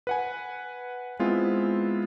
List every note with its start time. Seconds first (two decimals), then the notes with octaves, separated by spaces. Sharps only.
0.07 B4 F#5 G#5
1.19 G#3 B3 C4 E4 F4